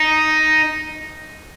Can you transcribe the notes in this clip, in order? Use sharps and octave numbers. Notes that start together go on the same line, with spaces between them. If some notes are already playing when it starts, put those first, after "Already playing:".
Already playing: D#4